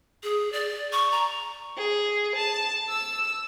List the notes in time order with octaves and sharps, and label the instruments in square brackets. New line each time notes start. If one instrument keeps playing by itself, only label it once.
[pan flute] G#4
D5
C#6
A#5
[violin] G#4
A5
E6